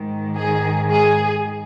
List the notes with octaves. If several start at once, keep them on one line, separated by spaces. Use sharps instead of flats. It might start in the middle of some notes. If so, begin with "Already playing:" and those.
Already playing: G#2 D#3
G#4
G#4